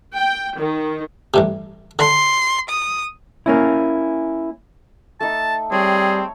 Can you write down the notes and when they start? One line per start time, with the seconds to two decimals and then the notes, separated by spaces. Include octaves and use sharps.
0.15 G5
0.59 D#3
1.34 A1 G2 C3
1.99 D3 C6
2.69 D#6
3.46 A#3 C#4 E4
5.20 A3 D#4 A5
5.72 G3 C4 G#4 C#5